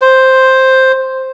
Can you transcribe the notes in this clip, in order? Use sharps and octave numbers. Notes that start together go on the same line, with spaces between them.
C5